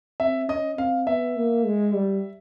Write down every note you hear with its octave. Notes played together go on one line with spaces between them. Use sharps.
C4 E5
C#4 D#5
C4 F5
B3 E5
A#3
G#3
G3